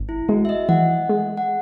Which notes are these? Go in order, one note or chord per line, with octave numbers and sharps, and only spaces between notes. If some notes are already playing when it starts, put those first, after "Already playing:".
Already playing: G#1
E4
G#3 F#4
E5
D#5
E3 F#5
G#3
F#5